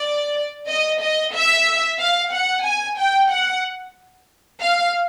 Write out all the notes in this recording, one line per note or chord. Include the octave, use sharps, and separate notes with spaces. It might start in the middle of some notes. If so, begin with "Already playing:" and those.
Already playing: D5
D#5
D#5
E5
F5
F#5
G#5
G5
F#5
F5